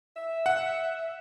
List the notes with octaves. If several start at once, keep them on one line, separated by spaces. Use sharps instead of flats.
E5
F#5